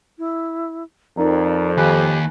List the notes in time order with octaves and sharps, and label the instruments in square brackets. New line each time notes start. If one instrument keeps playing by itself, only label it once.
[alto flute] E4
[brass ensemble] F2 [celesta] D#4 A#4 A#5 [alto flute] D5
[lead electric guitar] D#2 [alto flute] G4 [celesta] G#5 B5 F#6